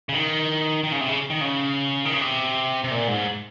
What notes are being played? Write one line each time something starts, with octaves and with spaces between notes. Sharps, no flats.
C#3
D#3
D#3
C#3
C3
C#3
D#3
C#3
D#3
C#3
C3
C3
A#2
G#2